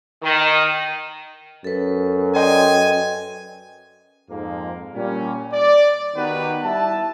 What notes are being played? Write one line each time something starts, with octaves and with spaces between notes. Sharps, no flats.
D#3
F#2 A4 B4
D#5 G5 G#5 C6
F2 G#2 A#3
A#2 G3 C#4
D5
D#3 B3 D#4 F#4 G4 B4
G3 E4 E5 A5